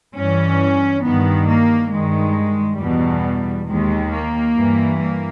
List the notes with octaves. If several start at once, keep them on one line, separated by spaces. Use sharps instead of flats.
G2 E3 C#4
G2 D#3 B3
A#3
G2 D#3 G#3
E2 B2 G3
D#2 D#3 G#3
A#3
G2 E3
A#3